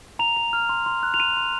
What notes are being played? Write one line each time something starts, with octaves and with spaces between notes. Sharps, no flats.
A#5 F7
A#5
F6
C6
C6
F#6
F7
C6 D#7
C6